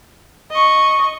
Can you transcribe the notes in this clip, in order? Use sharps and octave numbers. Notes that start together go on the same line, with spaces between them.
D#5 C#6